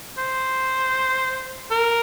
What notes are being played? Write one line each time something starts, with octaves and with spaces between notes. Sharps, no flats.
C5
A#4